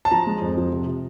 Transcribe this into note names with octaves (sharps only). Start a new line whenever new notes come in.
A5
F3 A#5
G#3
F2
F3
C3
C3